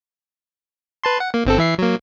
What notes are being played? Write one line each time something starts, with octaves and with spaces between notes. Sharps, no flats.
B4 A5 C6
F#5
A#3
G1 C4 A4
E3 E5 C7
F#3 A#3